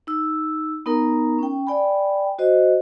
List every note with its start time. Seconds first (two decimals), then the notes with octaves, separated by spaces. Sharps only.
0.07 D#4 E6
0.86 B3 D#4 A#4 A#5
1.39 C#4 G5
1.67 D5 G5 G#5 B5
2.39 F#4 C5 D#5